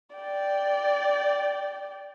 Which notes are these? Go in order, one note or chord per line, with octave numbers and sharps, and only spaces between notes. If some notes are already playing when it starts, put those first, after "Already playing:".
D5 G5